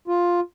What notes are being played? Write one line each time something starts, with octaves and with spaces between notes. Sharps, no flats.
F4